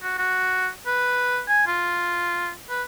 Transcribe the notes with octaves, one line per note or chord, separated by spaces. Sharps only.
F#4
F#4
B4
G#5
F4
B4